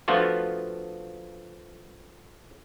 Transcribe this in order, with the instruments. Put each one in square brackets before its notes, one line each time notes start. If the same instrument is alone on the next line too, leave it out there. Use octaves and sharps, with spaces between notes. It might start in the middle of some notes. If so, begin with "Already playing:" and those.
[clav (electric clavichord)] F3 A3 B3 D4 F4 F#4